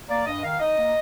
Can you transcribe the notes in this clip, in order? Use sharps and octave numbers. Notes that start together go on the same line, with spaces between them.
A#3 D5
G2 D#5
D#3 F5
D#4 D#5
A#3